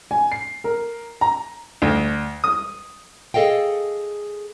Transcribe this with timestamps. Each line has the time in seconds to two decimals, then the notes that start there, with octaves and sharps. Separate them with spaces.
0.11 G#5
0.32 C7
0.64 A#4
1.21 A#5
1.82 D2
2.44 D#6
3.34 G#4 A4 D#5 F5 G5